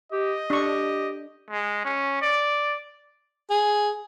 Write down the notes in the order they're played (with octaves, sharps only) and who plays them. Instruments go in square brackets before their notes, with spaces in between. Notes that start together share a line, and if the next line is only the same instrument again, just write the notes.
[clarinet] G4 [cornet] D#5
[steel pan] D4 C#6 [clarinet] G4
[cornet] G#3
C#4
D5
[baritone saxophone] G#4